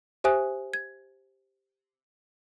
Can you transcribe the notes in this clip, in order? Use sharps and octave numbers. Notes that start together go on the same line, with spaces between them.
G4 C5 E5 G#5 D#6 F#6
G#6